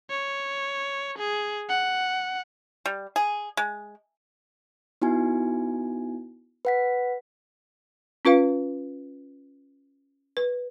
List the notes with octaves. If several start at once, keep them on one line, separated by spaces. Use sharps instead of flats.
C#5
G#4
F#5
G3
G#4
G#3
B3 D#4 E4 F#4 G#5
B4 F#5 B6
C#4 F4 B4 F5
B4